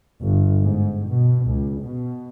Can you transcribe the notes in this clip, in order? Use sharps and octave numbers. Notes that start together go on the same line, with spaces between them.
G1
G#2
B2
C#2
B2